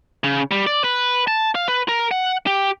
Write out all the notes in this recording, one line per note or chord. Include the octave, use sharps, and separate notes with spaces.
C#3
G3
D5
B4
A5
F5
B4
A#4
F#5
G4